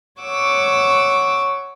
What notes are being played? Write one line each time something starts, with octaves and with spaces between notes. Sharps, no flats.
C#5 F#5 C#6 D6 E6